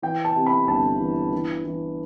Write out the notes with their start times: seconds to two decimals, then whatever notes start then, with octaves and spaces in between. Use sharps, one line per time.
0.02 E3 G5
0.24 A5
0.36 C3
0.46 B5
0.67 G1 A5
1.00 E3
1.32 E3
1.65 E3